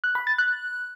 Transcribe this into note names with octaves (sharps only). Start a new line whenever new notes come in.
F#6
B5
A6
F#6